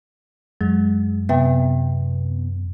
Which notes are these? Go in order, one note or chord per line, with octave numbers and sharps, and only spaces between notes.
F#2 F#3 G#3
C3 B3 E5 G5